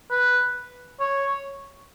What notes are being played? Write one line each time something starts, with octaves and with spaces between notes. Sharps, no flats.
B4
C#5